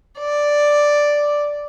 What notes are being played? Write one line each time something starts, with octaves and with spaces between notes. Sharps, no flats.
D5